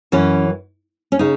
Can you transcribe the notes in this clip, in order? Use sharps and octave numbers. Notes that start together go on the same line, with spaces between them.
F#2 E3 C#4
C#4
C#3 D#4